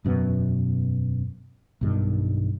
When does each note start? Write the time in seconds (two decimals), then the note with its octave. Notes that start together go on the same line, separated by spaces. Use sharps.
0.05 E1 F#2 B2 B3
1.81 B1 G2 D#3